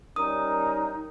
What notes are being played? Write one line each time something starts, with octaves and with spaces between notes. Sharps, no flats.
G3 C#4 D#4 A#4 D#6